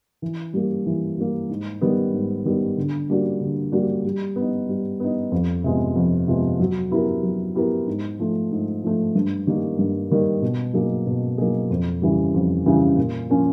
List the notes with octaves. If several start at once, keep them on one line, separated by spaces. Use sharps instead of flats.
E3
G3 A#3
E3
G3 A#3
G#2
D#3 G3 B3
G#2
D#3 G3 B3
D3
G3 A#3 D4 F#4
D3
G3 A#3 D4 F#4
G3
B3
D#4
G3
B3 D#4
F2
C3 F3 G#3 B3
F2
C3 F3 G#3 B3
F#3
B3 E4 G4 A#4
F#3
B3 E4 G4 A#4
G#2
F3 A3
G#2
F3 A3
G2
D#3 G3 A#3
G2
D#3 G3 A#3
B2
F#3 A#3 D#4 G#4
B2
F#3 A#3 D#4 G#4
F2
C#3 E3 G3
F2
C#3 E3 G3
A#2
F3 A#3 C#4